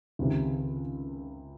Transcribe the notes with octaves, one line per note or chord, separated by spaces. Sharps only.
C#2 C3 D#3